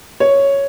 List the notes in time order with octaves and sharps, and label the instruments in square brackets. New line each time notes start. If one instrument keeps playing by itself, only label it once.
[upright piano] C#5